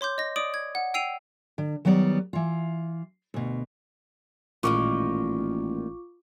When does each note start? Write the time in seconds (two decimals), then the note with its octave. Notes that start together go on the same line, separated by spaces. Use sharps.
0.01 C#5 C6 D6 G6
0.18 D#5 A#6
0.36 D5 D6 D#6 D7 F#7
0.54 G#6
0.75 F#5
0.94 G5 E6 C7 D#7 F7
1.58 D3
1.85 D#3 F#3 G3 B3 D5
2.33 E3 F4
3.34 D2 B2
4.63 A1 A#2 D#3 G#3 F4 C#6 D6